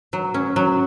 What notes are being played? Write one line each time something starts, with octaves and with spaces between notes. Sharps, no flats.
F#3
C#4
F#3